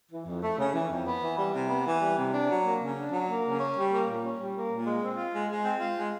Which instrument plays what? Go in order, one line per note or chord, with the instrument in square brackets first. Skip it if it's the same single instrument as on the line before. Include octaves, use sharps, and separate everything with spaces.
[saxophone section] E3
F2
A3
C#3
E3
F2
B3
E3
G3
C3
B3
E3
G3
C3
D4
F#3
A#3
C#3
D4
F#3
A#3
C#3
C#4
G3
A#3
A#2
C#4
G3
A#3
A#2
G#3
C4
F4
G#3
G#3
C4
F4
G#3